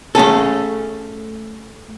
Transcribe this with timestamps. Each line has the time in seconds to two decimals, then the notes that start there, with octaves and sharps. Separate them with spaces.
0.15 A3 C#4 G#4 A4